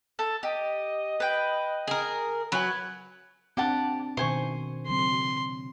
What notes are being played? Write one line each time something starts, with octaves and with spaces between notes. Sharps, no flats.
A4
G4 D#5
B4 G5
G#4 A#4
F#3 B4 G#5 F#6
C4 D4 G4 F#5 A5
B2 D#3 C5 G#5 C#6
C#3 F#3 C4 C6